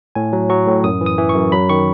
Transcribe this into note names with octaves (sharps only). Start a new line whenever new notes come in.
A2 G#5
F#3
F#3 C#6
A2
F#2 D#6
E3
D#6
E3
C#6
F#2
F#3 B5
D#3 C#6